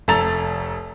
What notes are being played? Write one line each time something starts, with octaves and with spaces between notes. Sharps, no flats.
F1 A4 A#5 A6 F7